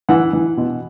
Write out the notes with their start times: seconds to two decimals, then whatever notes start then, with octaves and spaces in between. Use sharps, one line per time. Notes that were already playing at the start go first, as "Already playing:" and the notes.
0.09 E3 F#5
0.33 E3
0.57 B2